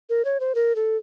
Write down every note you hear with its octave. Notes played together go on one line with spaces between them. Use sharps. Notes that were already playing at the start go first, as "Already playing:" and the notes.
A#4
C#5
C5
A#4
A4